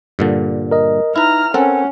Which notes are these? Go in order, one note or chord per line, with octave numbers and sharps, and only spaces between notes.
G2 A#2 D3
A#4 D#5
D#4 E4 B4 A#5 F6
C4 C#4 A4 A#4 F#5